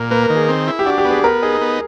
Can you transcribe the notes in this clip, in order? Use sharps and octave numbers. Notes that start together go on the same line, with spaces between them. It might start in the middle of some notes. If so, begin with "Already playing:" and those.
Already playing: A#2 A#4
A#3 B4
A#4
D#3
G#4
C4
E4
G4
D4 F#4
G4
B3
G#4
B3 A#4
D#4 G#4
B3